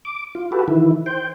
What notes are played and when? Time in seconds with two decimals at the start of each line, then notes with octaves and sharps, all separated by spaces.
0.05 D6
0.35 F4
0.52 F#4 G4 A4 B4
0.68 D#3 E3 E4
1.06 C5 G5